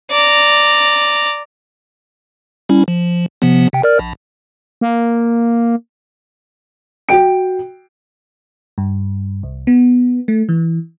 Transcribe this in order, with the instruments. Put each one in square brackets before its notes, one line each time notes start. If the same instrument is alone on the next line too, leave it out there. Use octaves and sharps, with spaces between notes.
[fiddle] D5 A#5
[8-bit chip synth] G3 C#4 E4
F3
C3 F3 B3
C3 G5
A#4 D5 F6
A#1
[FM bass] A#3
[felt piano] F#4 G5 D7
[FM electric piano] G2
C2
B3
A3
E3